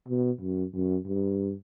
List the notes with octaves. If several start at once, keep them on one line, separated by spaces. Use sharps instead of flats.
B2
F#2
F#2
G2